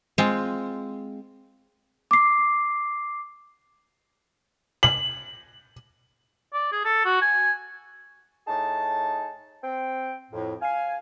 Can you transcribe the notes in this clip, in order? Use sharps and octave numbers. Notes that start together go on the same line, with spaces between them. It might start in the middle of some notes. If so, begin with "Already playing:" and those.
G#3 C4 F4
D6 C7
F#7
D5
G#4
A4
F#4
G#5
A2 D#4 G#4 A5
C4 G5
F2 A2
F5 G#5